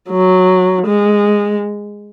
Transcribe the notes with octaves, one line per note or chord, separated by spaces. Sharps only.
F#3
G#3